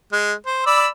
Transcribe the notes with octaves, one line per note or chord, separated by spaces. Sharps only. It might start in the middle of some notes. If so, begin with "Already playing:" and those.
G#3
C5
D5 B5 E6